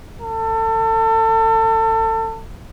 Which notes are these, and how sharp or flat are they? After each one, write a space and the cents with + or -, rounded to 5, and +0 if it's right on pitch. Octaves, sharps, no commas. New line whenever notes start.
A4 +30